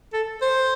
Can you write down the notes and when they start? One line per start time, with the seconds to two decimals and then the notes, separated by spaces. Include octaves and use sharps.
0.13 A4
0.42 C5